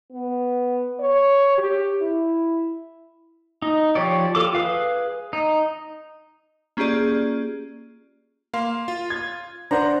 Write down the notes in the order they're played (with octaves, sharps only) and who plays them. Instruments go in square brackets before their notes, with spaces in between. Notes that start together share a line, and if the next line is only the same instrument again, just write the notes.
[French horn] B3
C#5
G4
E4
[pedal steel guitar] D#4
F3 G4 C#5 D5
F4 A4 D6
G#4 B4 F5
D#4
[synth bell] A#3 C#4 F4 G4 G#4 D5
[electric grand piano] A#3 F5 C6
F4
[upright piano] G#6
[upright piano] D4 C5 [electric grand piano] F#5 A#5